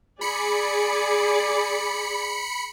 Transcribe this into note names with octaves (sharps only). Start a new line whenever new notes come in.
G#4 D5 B5 C#7